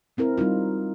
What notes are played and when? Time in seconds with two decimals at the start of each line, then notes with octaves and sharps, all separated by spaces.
0.17 G#3 C4 E4 A#4
0.38 G3 C4 D#4 F4